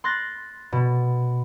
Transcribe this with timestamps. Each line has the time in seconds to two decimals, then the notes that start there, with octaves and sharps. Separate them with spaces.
0.04 C6 F#6 A6 A#6
0.72 B2